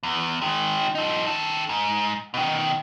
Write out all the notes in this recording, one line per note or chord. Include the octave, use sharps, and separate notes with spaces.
E2
D#3 G#3
F3 D#4
D#3 A4
G#2
B2 D#3